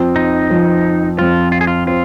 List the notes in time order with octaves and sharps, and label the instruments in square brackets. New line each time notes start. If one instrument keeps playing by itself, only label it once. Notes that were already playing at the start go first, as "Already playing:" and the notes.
Already playing: [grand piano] F2 F3 C4
[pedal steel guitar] D#4
[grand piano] F2 F3 C4
[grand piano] F2 F3 C4 [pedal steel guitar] F4
[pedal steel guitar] F4
G#4
F4
[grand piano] F3 C4 [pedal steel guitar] F4